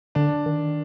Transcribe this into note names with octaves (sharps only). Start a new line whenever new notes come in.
D3 D4
D#3